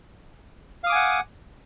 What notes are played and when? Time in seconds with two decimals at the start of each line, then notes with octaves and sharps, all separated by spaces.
0.84 F5
0.87 D#6
0.89 D6
0.92 G#5
0.95 F#5